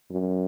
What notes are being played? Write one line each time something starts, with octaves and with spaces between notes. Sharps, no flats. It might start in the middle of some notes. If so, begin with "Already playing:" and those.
F#2